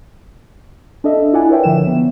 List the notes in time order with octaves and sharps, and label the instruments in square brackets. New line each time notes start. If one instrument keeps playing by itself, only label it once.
[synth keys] D4 A4 D#5 E5
D#5
E4 F4 D5 F#5 G#5
A#4 B4 C#5 E5 G5
D3 F3 E5 E7
B3